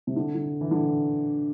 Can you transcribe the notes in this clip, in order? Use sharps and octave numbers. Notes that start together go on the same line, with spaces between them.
C3
D3
D3
E3
D3